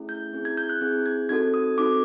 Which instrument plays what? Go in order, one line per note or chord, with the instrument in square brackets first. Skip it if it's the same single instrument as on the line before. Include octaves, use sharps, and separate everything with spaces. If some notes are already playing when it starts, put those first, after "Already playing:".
Already playing: [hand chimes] A3 C#4 E4 G#4
G6
C4 E4 G#4
G#6
G6
F#6
C4 E4 G#4 G6
G#6
C4 D#4 F#4 A4 G#6
D#6
C4 D#4 F#4 A4 D6